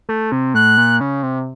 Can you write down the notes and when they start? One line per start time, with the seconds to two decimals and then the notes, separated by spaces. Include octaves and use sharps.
0.09 A3
0.32 C3
0.54 A2 F#6
0.77 A#2
1.01 C#3
1.23 C3